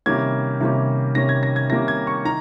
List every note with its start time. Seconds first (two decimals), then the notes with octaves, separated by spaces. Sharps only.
0.06 C3 D#3 G3 A#3 C#4 G#6
0.60 C3 D#3 G3 A#3 C#4
1.15 C3 D#3 G3 A#3 C#4 A#6
1.29 G#6
1.43 A#6
1.56 G#6
1.70 C3 D#3 G3 A#3 C#4 A#6
1.88 G#6
2.07 C#6
2.25 D#3 A#5